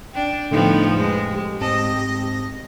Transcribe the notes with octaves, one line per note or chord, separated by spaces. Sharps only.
D4 G5
A2 D3 F3 A3 B3 D#4
F2 G#3 B4 G5
G4
G#2 C4 D#5 A5